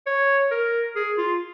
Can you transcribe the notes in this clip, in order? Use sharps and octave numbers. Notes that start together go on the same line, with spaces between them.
C#5
A#4
G#4
F4